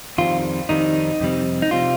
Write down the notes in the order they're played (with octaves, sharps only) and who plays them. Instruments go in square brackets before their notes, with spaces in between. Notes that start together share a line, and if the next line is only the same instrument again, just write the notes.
[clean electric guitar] F2 D#3 G3 C4 F4
F2 D#3 G3 C4 D#4
F2 C3 G3 C4
D#4
C3 G3 C4 F4